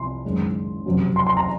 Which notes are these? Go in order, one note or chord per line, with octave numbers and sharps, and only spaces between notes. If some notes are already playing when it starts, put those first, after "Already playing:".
Already playing: C2 C3 F3 C6
F#1 F#2 D#3 G#3 C#4
F#1 F2 C3 F#3 C#4
C6
C6
A#5